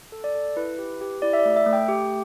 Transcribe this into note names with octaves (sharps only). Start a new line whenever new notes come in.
A4
D5
A4
E4 B4
G4
G4
E4 D5
E5
D5
A3
E5
A3
G5
G4